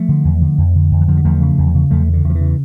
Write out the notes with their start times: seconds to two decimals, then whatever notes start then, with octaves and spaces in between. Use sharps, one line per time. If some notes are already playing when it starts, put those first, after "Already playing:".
Already playing: F3 A3
0.09 D3
0.25 E2
0.42 D3
0.58 F2
0.75 D3
0.91 F2
1.01 E3
1.08 D3 F3
1.17 G3
1.25 E2 F3 A3
1.41 C#3
1.58 E2
1.74 C#3
1.90 E2 F3 A3
2.08 C#3
2.13 D3
2.24 E2
2.30 F3
2.35 E3
2.41 C#3